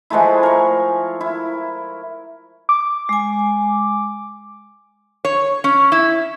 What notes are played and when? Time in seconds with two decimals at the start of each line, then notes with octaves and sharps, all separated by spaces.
0.10 F3 G#3 A3 E4
0.43 A#4 C#6
1.21 E4
2.69 D6
3.09 G#3 G#5
5.25 C#5
5.64 C#4
5.92 E4